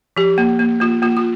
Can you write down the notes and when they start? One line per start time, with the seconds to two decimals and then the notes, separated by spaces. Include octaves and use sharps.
0.17 F3 G4
0.38 A#3
0.59 A#3
0.80 A#3 F4
1.02 A#3 F4
1.17 F4